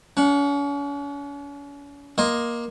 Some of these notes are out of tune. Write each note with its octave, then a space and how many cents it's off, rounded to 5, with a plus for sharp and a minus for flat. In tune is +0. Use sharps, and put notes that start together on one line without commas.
C#4 +40 F#5 -5
A#3 +15 D#5 +0 C6 +0